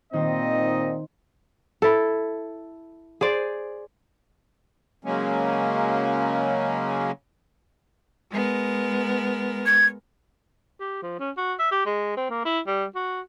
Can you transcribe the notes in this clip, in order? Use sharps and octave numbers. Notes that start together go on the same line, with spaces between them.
A#2 D#3 C4 D#4 C5 D#5
E4 A4
G#4 C5 D5
C#3 F#3 G#3 A#3 C#4
G#3 B3 A#4
G#6
G4
F3
C#4
F#4
E5
G4
G#3
C4
A#3
E4
G3
F#4